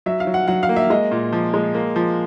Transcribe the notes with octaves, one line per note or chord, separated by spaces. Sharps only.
F#3 E5
F5
F#3
F#5
F#3 F#5
F5
A#3
E5
G#3 D#5
A#2
F3
G#3
A#3
F3